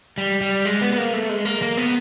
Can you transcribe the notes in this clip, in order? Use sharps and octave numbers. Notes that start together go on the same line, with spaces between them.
G3
G3
G#3
B3
B3
A#3
A3
G#3
A#3
A#3
B3